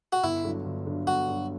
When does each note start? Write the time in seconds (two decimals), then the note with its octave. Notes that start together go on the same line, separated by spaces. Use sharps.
0.13 F#4
0.23 G1 E4
0.44 G2 D3 F#3
0.65 G1
0.86 G2 D3 F#3
1.07 G1 F#4
1.28 G2 D3 F#3